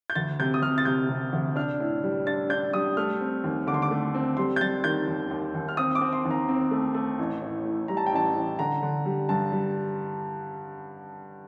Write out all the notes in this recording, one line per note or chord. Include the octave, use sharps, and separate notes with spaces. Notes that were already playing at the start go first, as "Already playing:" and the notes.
G6
D2 A6
C3 G6
D#6
C3 F6
A6
C3 G6
C3
D2
D4 F6
A2
G3
D4 A6
D4 G6
G3 D#6
A3 F6
C4
D#2
D3 D6
C6
D6
A3
C4
G3 C6
G6
G3 A6
D#3 G6
D#2
D#2
D#2
F6
C4 D#6
D6
C4
C6
D#2
A#5
C4
A3
A3
A1
A2
A2
G3 A#5
A5
G5
A1 A5
A1
D3 A#5
D3
G3
G2 A5
G3